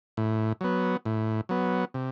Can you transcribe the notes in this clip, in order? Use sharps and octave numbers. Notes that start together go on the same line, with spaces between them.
A2
F#3 B3
A2
F#3 B3
C3